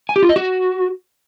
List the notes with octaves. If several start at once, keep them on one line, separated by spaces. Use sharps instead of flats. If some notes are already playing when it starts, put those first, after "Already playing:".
G#5
G4
F4
D#5
F#4